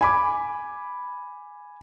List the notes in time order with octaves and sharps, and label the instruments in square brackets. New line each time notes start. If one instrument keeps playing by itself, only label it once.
[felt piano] G#5 B5 D6